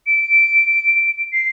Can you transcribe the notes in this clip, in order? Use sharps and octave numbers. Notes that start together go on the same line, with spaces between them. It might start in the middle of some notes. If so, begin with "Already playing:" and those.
D7
C7